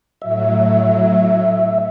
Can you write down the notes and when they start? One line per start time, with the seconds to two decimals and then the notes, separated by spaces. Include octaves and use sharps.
0.22 A2 F#3 E5